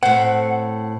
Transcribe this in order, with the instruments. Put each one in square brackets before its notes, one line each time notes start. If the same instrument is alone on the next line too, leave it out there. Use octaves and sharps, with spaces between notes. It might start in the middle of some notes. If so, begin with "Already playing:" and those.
[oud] A2 C4 [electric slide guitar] F#5